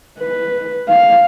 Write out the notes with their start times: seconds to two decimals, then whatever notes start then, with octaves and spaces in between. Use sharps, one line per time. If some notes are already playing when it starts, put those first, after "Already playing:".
0.20 B4
0.89 F5